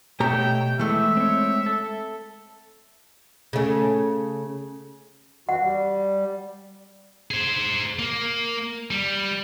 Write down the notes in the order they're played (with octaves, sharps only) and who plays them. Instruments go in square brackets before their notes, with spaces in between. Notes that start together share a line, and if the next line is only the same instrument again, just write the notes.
[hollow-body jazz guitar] B2 G4 A#5 [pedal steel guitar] A3 C#5 E5 [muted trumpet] G5
[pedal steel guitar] E3 [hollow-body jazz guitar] G#3 A3 [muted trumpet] E5
[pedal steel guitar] C4 C#5
A4
[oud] C#3 A3
[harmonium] F#2 E3 F#4 [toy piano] F#5
[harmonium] G3
[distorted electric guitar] G#4 C5
A#3
G3